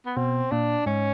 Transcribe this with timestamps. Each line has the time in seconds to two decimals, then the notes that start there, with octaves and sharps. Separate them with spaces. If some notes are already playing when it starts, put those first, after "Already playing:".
0.06 B3
0.17 B2 C4
0.51 A#2 D4
0.86 G#2 C#4